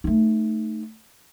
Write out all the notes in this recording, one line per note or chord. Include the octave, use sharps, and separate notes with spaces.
A3 D#4